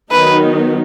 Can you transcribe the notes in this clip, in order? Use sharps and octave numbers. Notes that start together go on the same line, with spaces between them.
D#3 F#3 B3 D#4 B4